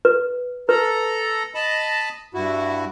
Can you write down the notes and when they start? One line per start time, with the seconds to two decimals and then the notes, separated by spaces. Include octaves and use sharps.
0.05 B4
0.69 A4 B4 A#5
1.55 D#5 A5 B5
2.34 G2 E4 F#4